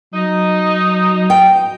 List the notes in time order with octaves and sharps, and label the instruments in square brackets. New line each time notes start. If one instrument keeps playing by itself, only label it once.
[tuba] F#3 [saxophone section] D#4
[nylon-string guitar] G5